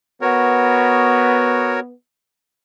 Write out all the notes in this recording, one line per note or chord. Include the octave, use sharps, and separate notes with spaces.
B3 F#4 A#4 C#5